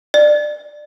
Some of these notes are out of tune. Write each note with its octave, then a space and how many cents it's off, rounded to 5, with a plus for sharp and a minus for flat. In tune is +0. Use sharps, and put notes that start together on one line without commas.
D5 +25